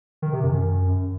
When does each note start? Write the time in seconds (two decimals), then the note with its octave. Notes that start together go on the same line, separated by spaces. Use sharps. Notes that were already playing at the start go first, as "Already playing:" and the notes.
0.22 D#3
0.33 C3
0.43 F#2